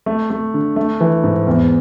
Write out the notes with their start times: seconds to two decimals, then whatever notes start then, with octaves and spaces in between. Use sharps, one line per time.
0.06 A3
0.30 A3
0.54 D3
0.76 A3
1.00 E3
1.24 G#2
1.47 E2